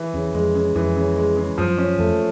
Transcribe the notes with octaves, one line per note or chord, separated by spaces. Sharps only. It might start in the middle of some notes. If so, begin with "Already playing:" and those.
Already playing: E3
E2 C#3
F2 G#3
C#3
F2 E3
C#3
G#3
C#3
F#2 F3
C#4
F2 A3